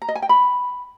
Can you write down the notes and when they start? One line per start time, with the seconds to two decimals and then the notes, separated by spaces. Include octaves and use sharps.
0.02 A#5
0.09 D#5
0.15 G#5
0.22 G5
0.29 B5